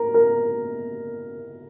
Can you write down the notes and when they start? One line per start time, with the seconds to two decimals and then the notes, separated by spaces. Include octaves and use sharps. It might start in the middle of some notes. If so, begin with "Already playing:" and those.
Already playing: A#4
0.14 A#4